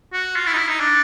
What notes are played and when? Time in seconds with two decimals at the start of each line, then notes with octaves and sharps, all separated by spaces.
0.13 F#4
0.36 F4
0.47 E4
0.53 D#4
0.58 E4
0.69 D#4
0.80 D4